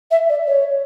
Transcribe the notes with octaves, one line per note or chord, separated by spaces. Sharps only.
E5
D5
C#5